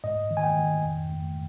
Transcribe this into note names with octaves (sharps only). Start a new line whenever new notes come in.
G#2 D#5
D#3
G#5
G5
D#3
F2
F2